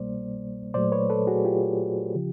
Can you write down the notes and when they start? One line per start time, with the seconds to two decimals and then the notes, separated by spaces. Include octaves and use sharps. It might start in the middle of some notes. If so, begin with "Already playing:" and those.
Already playing: C2 B2 G3 A#3 C5 D5
0.74 A#2 F#3 A3 C5 D5
0.92 B4 C#5
1.10 A4 B4
1.27 F#4 G#4
1.45 F4 G4
2.15 C#3 F3